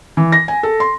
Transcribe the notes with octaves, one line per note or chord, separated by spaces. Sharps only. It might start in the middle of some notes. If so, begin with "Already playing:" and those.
E3
A#6
G#5
A4
C6